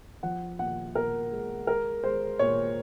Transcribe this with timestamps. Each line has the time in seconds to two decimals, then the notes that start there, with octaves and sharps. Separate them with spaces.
0.23 F3 F#5
0.59 A#2 F#5
0.95 A#2 A#4
1.32 G#3
1.67 G#3 A#4
2.04 G#3 C5
2.39 A#2 C#5